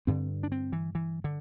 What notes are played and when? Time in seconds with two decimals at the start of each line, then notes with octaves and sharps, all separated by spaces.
0.07 G2 D3 C4
0.43 D4
0.52 C4
0.72 E3
0.95 E3
1.24 D3